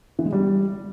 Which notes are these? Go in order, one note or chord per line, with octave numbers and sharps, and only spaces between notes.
E3
G#3
G3